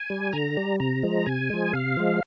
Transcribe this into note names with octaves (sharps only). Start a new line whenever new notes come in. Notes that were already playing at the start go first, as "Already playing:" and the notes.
Already playing: G#5
G3
D3 A#5
G3
C3 A#5
F3 G#3
C3 G#5
F3 G#3
C3 F5
F3 G#3